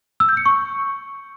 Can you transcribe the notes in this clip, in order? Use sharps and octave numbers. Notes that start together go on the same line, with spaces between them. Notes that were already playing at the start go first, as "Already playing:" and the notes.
E6
G6
C#7
C#6